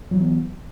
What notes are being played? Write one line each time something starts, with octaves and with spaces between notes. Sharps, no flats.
E3 F#3 B3